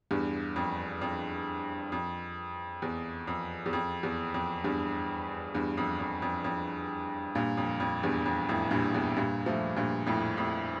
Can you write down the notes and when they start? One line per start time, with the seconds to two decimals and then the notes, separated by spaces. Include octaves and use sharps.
0.11 E2 G2
0.56 F2
1.02 F2
1.92 F2
2.82 E2
3.28 F2
3.66 E2
3.73 F2
4.03 E2
4.34 F2
4.64 E2 G2
5.55 E2 G2
5.77 F2
6.00 F2
6.22 F2
6.44 F2
7.35 G2 A#2
7.57 F2
7.80 F2
8.03 E2 G2
8.26 F2
8.49 F2 A2
8.71 G2 A#2
8.94 E2 G2
9.16 G2 A#2
9.46 F3 A3
9.76 G2 A#2
10.06 F2 A2
10.37 F2 A2